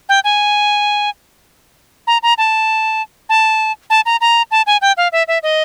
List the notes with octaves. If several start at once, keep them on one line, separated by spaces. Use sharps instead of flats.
G5
G#5
A#5
A#5
A5
A5
A5
A#5
A#5
A5
G#5
G5
F5
E5
E5
D#5